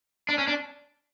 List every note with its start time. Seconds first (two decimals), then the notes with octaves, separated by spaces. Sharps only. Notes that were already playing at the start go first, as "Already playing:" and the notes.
0.29 D4
0.38 C#4
0.47 D4